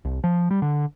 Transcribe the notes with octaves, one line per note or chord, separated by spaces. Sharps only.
C2
F3
G3
D3